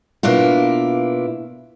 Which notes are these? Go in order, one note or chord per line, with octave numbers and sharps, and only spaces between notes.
B2 A#3 D4 E4 F4